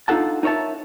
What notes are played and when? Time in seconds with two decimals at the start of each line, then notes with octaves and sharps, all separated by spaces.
0.08 D4 D#4 F4 A4 F#5 A5
0.43 D#4 A#4 C#5 E5 A5